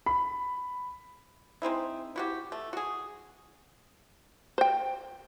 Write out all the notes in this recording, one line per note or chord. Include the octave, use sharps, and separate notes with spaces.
B5
G#3 C4 D#4 E4
E4 F#4 G4
A3
F#4 G#4
C5 G5